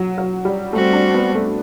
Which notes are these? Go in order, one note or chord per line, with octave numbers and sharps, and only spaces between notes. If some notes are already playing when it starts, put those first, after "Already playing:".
Already playing: F#3
F#3
G3
G3 A3 C4 F#4
D4
B3
A3